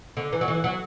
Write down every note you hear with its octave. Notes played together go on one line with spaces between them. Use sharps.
D3
E3
F#3
E3
F#3